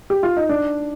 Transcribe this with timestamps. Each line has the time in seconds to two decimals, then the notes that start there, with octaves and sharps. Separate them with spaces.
0.10 G4
0.23 F4
0.37 D#4
0.49 D4